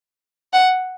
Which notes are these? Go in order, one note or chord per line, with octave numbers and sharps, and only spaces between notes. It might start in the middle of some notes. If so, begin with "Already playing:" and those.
F#5